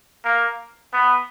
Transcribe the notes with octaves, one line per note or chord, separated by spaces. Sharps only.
A#3
B3